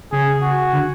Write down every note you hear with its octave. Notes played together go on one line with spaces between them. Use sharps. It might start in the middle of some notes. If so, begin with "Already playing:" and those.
C#3 G#4
F#4
D3